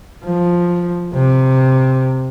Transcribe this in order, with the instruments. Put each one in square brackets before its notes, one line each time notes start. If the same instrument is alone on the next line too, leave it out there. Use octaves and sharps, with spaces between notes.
[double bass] F3
C3